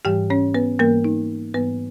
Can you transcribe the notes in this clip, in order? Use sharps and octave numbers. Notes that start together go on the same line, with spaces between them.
G#2 E3 G3 G4 G5
C#4 C#5
B3 B4
G#2 E3 G3 A#3 A#4
D#4
G#2 E3 G3 B3 B4